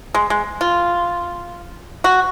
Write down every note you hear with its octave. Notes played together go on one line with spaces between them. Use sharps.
G#3
G#3
F4
F#4